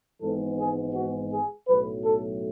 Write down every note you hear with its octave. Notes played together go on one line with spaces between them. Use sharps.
G#1 G#2 E3 G#3 B3 A4
G#4
F#4
G#4
B1 A2 F#3 B4
A4